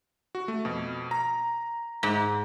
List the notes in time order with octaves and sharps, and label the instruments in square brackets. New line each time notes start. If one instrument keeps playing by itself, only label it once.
[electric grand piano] F#4
A3
F2 B2
A#5
[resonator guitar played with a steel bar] G#2